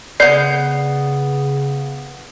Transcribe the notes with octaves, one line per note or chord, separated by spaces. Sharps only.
C#3 B3 D5 G6 C7